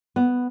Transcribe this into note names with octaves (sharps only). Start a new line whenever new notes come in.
B3